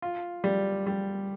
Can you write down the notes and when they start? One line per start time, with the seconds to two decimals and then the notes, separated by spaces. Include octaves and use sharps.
0.02 F4
0.44 G3
0.87 G3